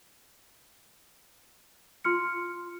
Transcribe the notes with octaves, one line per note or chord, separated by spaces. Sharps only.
F4 C6 F6 C#7